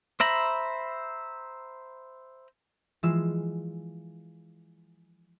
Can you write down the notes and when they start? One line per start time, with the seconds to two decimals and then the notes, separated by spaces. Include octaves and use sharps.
0.20 C5 E5 A#5 B5
3.03 E3 F3 G#3 F4 E6 E7